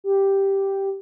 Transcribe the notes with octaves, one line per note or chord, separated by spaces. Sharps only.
G4